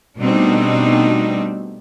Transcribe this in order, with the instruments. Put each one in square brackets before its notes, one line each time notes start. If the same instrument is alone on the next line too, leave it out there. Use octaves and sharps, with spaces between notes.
[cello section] B2 G3 A3 C4 D4 D#4